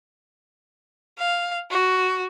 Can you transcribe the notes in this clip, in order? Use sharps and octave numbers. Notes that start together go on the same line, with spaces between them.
F5
F#4